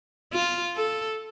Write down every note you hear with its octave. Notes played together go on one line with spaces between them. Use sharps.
F4
A4